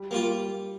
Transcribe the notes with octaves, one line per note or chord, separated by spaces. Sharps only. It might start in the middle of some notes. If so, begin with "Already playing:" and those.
Already playing: G3
G3 A#3 F4